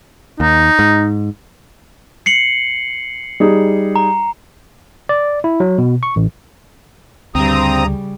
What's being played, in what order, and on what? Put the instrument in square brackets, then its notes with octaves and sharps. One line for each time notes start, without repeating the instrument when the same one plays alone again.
[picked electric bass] D#2 [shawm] D#4
[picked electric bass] G#2
[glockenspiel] C7 C#7 F#7
[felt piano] G3 D#4 G#4
[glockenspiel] A#5
[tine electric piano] D5
E4
F#3
B2
C#6
A1
[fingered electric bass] D2 [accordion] G2 A#5 D#6 [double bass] C#3 G3 [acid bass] C4